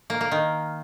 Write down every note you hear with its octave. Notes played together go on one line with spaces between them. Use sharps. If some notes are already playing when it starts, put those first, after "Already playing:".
A#3
A#3
D#3